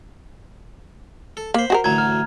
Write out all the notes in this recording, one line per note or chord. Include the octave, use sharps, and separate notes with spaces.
A4
A#3 C5 B5
F#4 G#4 A#4
A1 D2 F#3 A#5 G#6
F6